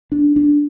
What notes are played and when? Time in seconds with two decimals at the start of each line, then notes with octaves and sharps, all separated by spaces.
0.12 D4
0.36 D4